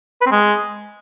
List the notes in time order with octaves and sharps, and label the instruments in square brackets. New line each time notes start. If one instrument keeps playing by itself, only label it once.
[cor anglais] B4
C4
G#3